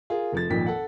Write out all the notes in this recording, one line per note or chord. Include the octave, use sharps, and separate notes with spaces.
F4 G#4 A#4
F1 F3 A6
G#1 F2 A#2 D#3 B6
A4 F#5